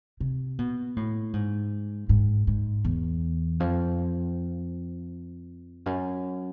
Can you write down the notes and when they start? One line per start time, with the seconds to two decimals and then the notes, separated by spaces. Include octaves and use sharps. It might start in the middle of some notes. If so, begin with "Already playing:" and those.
0.20 C3
0.59 B2
0.97 A2
1.33 G#2
2.09 G#2
2.47 G#2
2.85 E2
3.60 F2
5.86 F#2